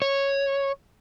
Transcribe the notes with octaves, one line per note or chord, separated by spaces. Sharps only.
C#5